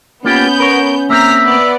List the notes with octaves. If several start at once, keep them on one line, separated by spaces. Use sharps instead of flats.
A#3 B3 C#4 F4 G4 G6
A#4 C#5
A#3 C4 E5 A#5 F6 B6
B3 D5